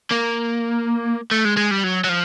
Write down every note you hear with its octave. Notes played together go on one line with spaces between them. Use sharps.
A#3
A3
G#3
G#3
G3
F#3
F#3
F3